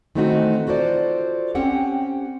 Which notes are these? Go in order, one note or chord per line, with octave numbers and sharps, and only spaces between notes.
D#3 E3 A3 C4 D#4 F#4
F4 F#4 A4 C5 D5
C4 C#4 G4 F#5 G5